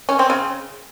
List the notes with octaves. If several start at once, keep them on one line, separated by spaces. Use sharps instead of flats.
C#4
C4
C#3